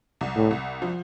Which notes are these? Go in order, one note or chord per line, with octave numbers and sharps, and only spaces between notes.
C2
A2
C2
F3